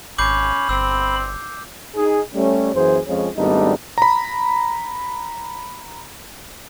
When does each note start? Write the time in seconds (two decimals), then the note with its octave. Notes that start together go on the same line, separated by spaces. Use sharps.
0.18 G#1 C#4 B5 D6 G6 C7
0.69 G1 C4 E6
1.95 D#4 G#4
2.34 G3 A3 C#4
2.73 F#2 E3 A#3 G#4 C5
3.06 F2 F3 G#3 C#4
3.36 G#1 G3 A3 B3 D4 D#4
3.98 A#5 B5